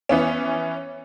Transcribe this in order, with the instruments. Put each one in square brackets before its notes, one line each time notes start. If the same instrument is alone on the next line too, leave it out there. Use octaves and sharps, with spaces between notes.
[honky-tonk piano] E3 B3 C#4